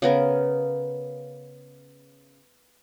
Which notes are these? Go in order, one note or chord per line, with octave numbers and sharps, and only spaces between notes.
C#3 B3 A#4